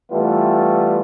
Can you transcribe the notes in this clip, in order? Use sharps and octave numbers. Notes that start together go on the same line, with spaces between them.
E3 G3 A3 B3 F4